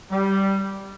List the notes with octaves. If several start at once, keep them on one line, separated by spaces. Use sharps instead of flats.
G3